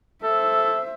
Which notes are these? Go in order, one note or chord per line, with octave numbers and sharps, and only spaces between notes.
A4 C5 E5